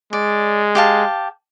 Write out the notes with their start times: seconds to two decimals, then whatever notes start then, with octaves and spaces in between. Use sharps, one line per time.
0.13 G#3 D5
0.75 G4 F5 A5